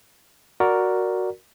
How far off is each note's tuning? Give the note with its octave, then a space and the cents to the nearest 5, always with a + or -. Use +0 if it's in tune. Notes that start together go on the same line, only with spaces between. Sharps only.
F#4 +0 A#4 +0 D5 +0